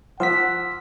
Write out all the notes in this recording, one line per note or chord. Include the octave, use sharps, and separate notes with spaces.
F3 F#5 C6 E6 B6